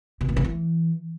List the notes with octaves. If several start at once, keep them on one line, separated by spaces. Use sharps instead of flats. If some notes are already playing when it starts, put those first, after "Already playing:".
B2
A#2
C3
E3